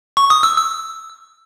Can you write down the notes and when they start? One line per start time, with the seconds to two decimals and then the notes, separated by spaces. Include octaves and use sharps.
0.17 C#6
0.30 D#6
0.43 E6
0.56 E6